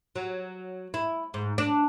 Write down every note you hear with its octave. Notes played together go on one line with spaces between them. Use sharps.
F#3
E4
G#2
D4